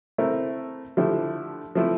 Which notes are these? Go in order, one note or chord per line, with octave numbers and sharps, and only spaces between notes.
A3 C4 E4 A#4
D3 F3 A3 E4 G4
F3 A3 C4 E4